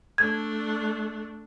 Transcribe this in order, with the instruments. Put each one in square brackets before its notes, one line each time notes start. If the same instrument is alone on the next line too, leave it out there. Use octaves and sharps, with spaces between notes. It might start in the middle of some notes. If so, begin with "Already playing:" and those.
[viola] A3 D4 [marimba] G#6